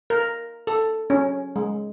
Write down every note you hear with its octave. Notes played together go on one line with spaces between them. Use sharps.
A#4
A4
C#4
G#3